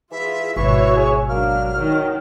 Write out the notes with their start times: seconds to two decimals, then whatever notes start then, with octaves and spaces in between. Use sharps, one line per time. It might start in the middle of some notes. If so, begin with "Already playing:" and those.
0.11 E3 F4 G#4 E5
0.56 G#1 B2 E3 F#4 C#5 E5 C#6
0.97 G#4
1.29 F#3 A#3 D4 F6
1.75 D#3 F#3